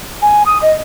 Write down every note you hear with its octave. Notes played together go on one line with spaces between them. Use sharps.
G#5
D#6
D#5